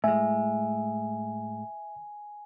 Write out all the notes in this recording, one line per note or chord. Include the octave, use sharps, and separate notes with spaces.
A2 G#3 E5 G#5